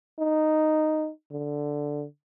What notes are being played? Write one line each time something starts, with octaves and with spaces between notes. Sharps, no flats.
D#4
D3